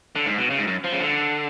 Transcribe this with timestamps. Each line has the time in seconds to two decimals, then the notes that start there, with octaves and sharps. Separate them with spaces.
0.16 D3
0.26 G#2
0.38 B2
0.50 C#3
0.59 G#2
0.67 F#2
0.84 F3
0.92 C#3
1.01 D3